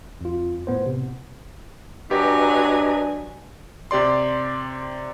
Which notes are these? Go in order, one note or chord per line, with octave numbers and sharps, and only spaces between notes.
F2 F4
A2 B3 C5
C3
F#3 D4 G4 B4 D#5 G#5 A#5
C3 G4 D5 C6